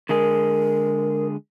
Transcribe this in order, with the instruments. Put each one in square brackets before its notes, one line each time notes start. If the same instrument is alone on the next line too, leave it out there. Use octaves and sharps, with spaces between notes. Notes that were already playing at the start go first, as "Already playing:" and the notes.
[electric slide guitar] D3 G#3 G#4 [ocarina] A#4